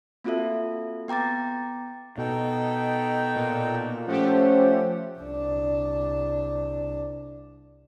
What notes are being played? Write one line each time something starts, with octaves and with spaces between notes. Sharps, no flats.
A#3 C4 F4 F#4 A4 E5
B3 G5 A#5 D6 A6
B2 D#4 A4 G5
A#2
F3 A3 C#4 G4 C5 F#5
C2 D4